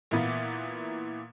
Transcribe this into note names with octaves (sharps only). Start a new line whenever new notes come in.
A#2 E3 A#3 B3